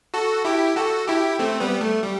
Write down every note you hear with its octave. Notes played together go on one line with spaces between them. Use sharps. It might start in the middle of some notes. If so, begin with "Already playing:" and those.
F#4 A4
E4 G4
F#4 A4
E4 G4
A3 C4
G3 B3
A3
G3